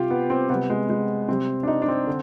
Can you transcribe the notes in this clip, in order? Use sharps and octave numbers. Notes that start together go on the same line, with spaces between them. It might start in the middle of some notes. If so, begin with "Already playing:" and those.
Already playing: C3 G3 F4 G4
B3
C4
C3 G3 B3
G#3
G#3
C3 G3 C4
D4
D#4
D4
C4
D3